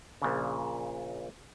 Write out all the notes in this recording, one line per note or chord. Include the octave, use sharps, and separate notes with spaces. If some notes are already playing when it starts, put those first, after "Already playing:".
A#1 A#2 C#3